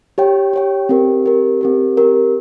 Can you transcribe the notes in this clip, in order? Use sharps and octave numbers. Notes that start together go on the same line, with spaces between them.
G4 C#5 G5
G4 C#5 G5
C4 G4 A#4
C4 G4 A#4
C4 G4 A#4
C4 G4 A#4